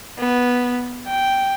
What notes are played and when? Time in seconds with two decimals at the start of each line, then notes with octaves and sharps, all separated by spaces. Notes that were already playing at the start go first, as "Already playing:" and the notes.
0.19 B3
1.07 G5